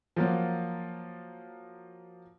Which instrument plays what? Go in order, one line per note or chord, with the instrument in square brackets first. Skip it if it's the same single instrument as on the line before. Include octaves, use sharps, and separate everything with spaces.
[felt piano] F3 F#3 A#3